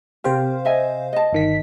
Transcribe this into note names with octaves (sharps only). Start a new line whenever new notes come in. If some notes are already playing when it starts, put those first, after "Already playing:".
C3 G4 A#4 C5 F5
D#5 E5 G#5
D#5 A5
G1 D#3 B6